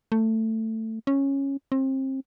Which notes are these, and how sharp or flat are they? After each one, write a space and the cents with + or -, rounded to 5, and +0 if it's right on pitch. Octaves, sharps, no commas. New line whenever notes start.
A3 +15
C#4 -10
C4 +30